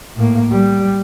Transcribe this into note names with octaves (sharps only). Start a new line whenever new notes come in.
A2 A#3
G3